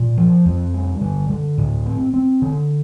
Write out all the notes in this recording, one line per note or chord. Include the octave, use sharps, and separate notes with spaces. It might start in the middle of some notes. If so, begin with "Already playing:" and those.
Already playing: A#2
F3
F2
G3
D3
D3
A2
C4
C4
D3